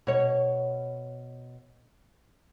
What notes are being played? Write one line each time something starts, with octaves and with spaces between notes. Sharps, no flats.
B2 C#5